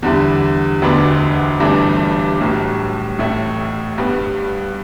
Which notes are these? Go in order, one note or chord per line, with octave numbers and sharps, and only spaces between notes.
E2 D3 G3 E4
E1 D2 D3 B3 D4
G1 G2 E3 A3 D4
B1 A2 G3
A1 A2 A3
G2 G3 B3